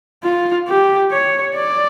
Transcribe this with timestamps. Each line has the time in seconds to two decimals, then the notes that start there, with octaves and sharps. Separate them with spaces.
0.24 F4
0.68 G4
1.12 C#5
1.56 D5